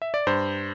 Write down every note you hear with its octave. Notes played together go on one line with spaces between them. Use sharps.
E5
D5
G2 C5